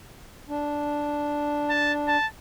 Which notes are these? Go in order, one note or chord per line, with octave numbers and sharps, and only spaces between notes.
D4
A5
A5